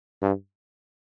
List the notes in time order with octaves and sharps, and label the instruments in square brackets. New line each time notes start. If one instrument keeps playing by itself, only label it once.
[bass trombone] G2